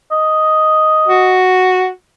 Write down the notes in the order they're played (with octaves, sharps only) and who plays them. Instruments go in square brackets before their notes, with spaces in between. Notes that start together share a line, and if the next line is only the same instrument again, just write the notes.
[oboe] D#5
[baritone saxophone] F#4